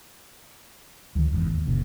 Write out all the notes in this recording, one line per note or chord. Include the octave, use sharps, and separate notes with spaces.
D2 D#3 F3
F#1 E2 G#2
D#2
F#1 A#2 C#3